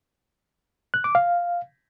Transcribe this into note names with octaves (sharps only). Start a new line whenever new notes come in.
F#6
D6
F5